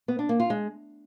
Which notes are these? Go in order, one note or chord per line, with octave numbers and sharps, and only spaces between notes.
B3
D4
A#3
F4
G#3